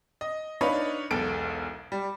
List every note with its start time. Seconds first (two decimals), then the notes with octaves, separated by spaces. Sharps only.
0.21 D#5
0.61 D4 D#4 B4 C#5 D5 F5
1.11 E1 B1 A4 D7
1.92 G3